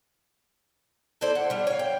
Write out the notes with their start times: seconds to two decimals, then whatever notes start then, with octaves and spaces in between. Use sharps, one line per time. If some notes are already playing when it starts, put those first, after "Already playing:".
1.21 E4 A4 C5 D5
1.35 F#5
1.50 G3 D4
1.67 C#5 F5
1.79 G5